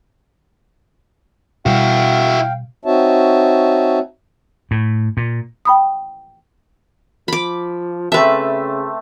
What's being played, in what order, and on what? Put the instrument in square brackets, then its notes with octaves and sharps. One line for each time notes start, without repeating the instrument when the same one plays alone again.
[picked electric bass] B2 G3 [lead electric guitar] E4 F#4 [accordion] F5 G5
[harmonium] C4 D#4 F#4 C#5 E5 A5
[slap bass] A2
A#2
[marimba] G5 B5 D#6
[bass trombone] F3 [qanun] B5 D6
[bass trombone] C#3 [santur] A3 C4 A5 [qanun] B4 E5